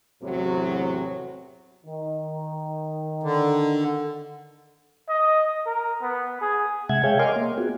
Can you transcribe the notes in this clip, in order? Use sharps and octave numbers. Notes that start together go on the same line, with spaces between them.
E2 A2 C3 F#3
D#3
D3
D#5
A#4
B3
G#4
C3 G#3 E5 F#5 G#6
G#4 C#5 E5 F5 G5 G#5
A#4 C#5 D#5 C6 D6 F6
A#3
B3 F4 F#4 G#4